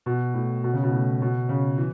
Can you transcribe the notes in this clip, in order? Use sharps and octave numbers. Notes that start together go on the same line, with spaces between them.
B2
A2
B2
C#3
B2
A2
B2
C#3
E3